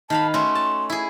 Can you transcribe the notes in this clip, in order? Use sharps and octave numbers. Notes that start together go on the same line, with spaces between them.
D#3 F5 A5 B5
A3 C#4 F#4 C6
A5
E4 G#4